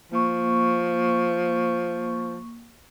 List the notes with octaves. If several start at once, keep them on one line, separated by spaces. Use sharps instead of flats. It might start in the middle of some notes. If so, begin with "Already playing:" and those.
F3 A#3 C#6